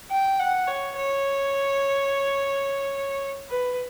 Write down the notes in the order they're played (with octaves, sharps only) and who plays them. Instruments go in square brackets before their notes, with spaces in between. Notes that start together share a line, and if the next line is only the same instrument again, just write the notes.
[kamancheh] G5
F#5
C#5
C#5
B4